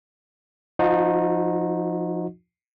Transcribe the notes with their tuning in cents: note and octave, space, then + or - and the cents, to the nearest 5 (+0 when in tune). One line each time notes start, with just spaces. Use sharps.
F3 +0 D#4 +0 F#4 -35